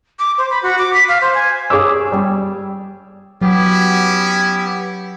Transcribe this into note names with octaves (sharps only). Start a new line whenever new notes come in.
D6
C5
B5
F#4
D6
B6
F5
C5
G#5
G#4 C#5 D6 E6
G3
F#3 B3 C#4 E4 G4